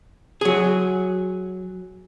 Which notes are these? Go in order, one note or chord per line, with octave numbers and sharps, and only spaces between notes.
F#3 G#4